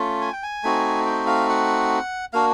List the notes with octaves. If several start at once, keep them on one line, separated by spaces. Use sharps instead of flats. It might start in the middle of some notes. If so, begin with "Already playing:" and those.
Already playing: A3 C#4 F4
G#5
G5
G#5
A3 C4 D#4 F#4
G5
F5
F#5
A#3 D4 F#4 F5